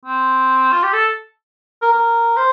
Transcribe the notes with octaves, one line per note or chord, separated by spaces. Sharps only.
C4
F4
G4
A4
A#4
A#4
C5